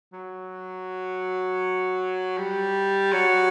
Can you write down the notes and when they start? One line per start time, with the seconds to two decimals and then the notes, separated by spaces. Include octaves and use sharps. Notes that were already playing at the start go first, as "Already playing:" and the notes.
0.13 F#3
2.38 G3
3.12 F#3